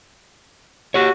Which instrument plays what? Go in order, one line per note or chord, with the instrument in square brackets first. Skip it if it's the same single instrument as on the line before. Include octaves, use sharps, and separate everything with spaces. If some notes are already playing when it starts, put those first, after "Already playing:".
[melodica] F#4 [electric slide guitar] G4 C#5